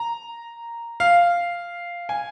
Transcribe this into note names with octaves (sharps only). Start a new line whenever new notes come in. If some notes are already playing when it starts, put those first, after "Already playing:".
Already playing: A#5
F5
G#5